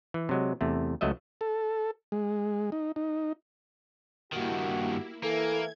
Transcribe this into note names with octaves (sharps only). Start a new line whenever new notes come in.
E3
C3 F#3 G#3
E2 C3 A3
C#2 F#3 A3 D#5 E5
A4
G#3
D#4
D#4
G2 D#3 A#3 E4 F#4 G4
E3 A#3 A4 G#6